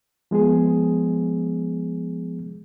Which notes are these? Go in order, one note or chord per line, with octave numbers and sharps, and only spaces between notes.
F3 G#3 B3 G#4